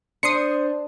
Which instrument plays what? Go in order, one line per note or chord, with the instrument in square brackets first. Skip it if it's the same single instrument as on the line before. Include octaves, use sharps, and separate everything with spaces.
[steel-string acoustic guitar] D4 [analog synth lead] C5 [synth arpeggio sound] D#6 C7 C#7